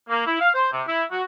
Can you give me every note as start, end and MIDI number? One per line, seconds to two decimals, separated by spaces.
0.09 0.24 58
0.27 0.39 64
0.41 0.49 77
0.55 0.72 72
0.72 0.82 48
0.87 1.03 64
1.11 1.23 66